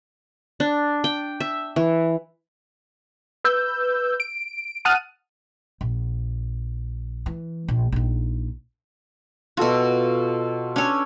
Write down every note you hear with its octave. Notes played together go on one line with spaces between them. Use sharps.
D4
G5
E5
E3
B4 E6 G6
D7
F#5 A5 D#6 F6 F#6 D#7
A#1
E3
A#1
A#1 D#4
B2 F4 F#4 A4 A5
C#4 D4 C#5 G#5 E6